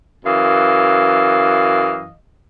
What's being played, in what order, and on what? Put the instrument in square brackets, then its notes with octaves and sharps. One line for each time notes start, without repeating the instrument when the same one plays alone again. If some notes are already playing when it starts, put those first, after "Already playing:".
[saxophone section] F#2 E3 D#5 F5